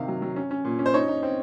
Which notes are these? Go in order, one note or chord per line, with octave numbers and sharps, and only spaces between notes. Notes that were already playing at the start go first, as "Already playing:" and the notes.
Already playing: C3 D#3 F5
F#3
F#3
C#4
C#4
A#2
C#4
C5
D#4 C#5
D#4
C4